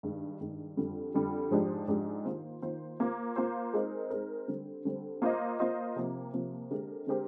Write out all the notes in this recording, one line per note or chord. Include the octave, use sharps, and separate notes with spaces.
G2 D#3 G#3
G2 D#3 G#3
F2 D3 G3
F2 D3 G3
G#2 F3 G#3 D4 G4
G#2 F3 G#3 D4 G4
D#3 A#3 F4 C5
D#3 A#3 F4 C5
A#3 F4 C5
A#3 F4 C5
G#3 C4 D#4 A#4
G#3 C4 D#4 A#4
D3 G3 C4
D3 G3 C4
A#3 F4 C5 D#5
A#3 F4 C5 D#5
C3 F3 A#3
C3 F3 A#3
D3 G#3 C4 G4 A#4
D3 G#3 C4 G4 A#4